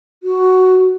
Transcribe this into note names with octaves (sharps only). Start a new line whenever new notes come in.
F#4